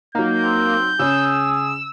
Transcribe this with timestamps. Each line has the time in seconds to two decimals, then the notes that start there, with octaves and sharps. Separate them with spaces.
0.15 F#3 A#3 D#4 G6
0.44 C4
0.99 C#3 C#4 G#4 E6